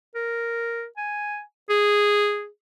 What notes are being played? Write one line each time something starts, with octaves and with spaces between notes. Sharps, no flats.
A#4
G#5
G#4